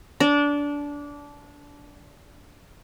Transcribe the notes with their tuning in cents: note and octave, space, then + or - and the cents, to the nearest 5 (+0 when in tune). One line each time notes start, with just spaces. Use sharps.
D4 -20